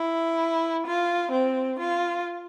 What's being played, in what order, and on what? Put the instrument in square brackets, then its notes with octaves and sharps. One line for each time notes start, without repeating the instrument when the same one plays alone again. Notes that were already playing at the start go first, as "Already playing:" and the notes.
Already playing: [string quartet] E4
F4
C4
F4